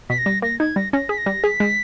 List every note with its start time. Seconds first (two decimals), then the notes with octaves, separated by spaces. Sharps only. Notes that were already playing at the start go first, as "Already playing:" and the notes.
0.10 B2 B6
0.18 A#6
0.26 G3
0.42 A#3 A#6
0.60 D#4 G#6
0.76 G3 A#6
0.93 C#4 A#6
1.09 G#4 B6
1.18 A#6
1.26 G3
1.43 G#4 B6
1.60 G#3